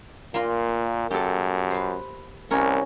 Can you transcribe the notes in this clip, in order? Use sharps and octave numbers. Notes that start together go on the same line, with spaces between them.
A#2 A#3 F4
F#2 G4 A4
B4 C5
C2 C#4 A#4 C#5